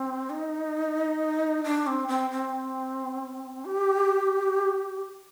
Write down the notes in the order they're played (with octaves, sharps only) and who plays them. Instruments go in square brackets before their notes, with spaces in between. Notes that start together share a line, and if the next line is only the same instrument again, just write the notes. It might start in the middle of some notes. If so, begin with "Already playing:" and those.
Already playing: [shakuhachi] C4
D#4
D4
C4
C4
C4
G4